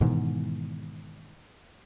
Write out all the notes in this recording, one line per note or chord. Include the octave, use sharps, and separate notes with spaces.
G#2 B2 D#3 E3